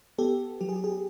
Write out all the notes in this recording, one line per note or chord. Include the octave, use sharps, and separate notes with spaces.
B3 G4 A4
F#3 G4
G#4
G4
G#4
G4